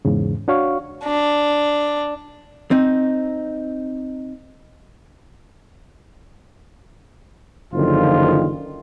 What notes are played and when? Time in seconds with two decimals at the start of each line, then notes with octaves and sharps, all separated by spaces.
0.05 E2 G#2 C#3
0.48 D4 F#4 C#5 F5 C#6
1.05 D4
2.71 C4 D#4
7.73 F#1 D3 D#3 F3 F4